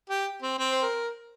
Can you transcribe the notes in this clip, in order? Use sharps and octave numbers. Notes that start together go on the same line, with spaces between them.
G4
C4
C4
C5
A#4